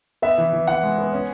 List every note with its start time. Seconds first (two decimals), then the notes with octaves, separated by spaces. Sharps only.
0.22 B3 E5
0.38 E3
0.53 E3
0.67 E3 F#5
0.83 G#3
0.98 B3
1.13 C#4